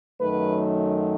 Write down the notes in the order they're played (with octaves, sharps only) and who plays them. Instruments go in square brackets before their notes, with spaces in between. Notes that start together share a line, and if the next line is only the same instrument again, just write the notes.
[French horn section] F#2 D#3 F#3 A3 B4